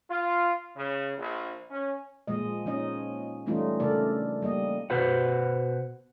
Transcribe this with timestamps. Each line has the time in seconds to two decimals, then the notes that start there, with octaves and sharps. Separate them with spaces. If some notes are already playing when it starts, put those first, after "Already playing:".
0.10 F4
0.76 C#3
1.18 A#1
1.71 C#4
2.27 A#2 F3 G#3 D#5
2.66 F3 C#4 D#4 D#5
3.46 E3 G3 A3 C#4 D#4 F4
3.80 C#3 A3 D4 A4 A#4 D5
4.42 G3 A#3 D#5
4.90 B2 F#4 B4 C5 F#5